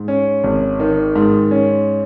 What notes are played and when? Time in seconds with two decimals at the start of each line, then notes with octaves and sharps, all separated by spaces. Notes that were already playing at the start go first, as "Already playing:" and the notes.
Already playing: G#2
0.08 C#4
0.44 G#1
0.80 D#3
1.16 G#2
1.51 C#4